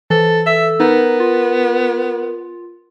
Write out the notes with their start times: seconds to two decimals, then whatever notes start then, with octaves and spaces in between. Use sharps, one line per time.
0.10 E3 A4 C5
0.46 A4 E5 E6
0.80 B3 D#4 A#4
1.20 F4